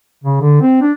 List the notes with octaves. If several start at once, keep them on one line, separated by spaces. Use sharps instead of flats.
C#3
D3
C4
D4